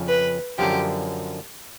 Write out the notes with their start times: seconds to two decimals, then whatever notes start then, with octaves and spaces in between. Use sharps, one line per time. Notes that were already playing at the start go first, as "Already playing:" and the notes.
Already playing: F2 C#3 F3
0.08 B4
0.58 F#2 D3 F3 G4